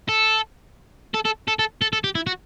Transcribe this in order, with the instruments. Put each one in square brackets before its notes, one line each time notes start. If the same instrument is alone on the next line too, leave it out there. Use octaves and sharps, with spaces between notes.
[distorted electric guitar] A4
A4
A4
A4
A4
A4
A4
G4
E4
F#4